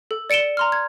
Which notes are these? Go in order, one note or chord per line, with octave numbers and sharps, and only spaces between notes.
A4
D5 C#7 D7 E7 G7
A#5 C6 F6
G#6